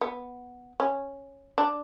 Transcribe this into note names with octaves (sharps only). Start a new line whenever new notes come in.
B3
C#4
D4